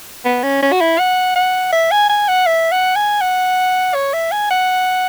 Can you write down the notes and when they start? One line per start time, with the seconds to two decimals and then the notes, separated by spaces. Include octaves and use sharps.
0.25 B3
0.43 C#4
0.63 C#4
0.72 F#4
0.81 E4
0.99 F#5
1.36 F#5
1.72 E5
1.91 G#5
2.09 G#5
2.28 F#5
2.47 E5
2.72 F#5
2.96 G#5
3.21 F#5
3.94 C#5
4.13 E5
4.32 G#5
4.51 F#5